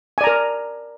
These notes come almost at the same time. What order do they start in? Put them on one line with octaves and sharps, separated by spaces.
G#5 D5 A#5 A#4